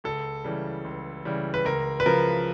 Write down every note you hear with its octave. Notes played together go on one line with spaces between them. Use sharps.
C#2 A4
C#3 E3 G3
C#2
C#3 E3 G3
B4
C#2 A#4
B4
C#3 F3 A#4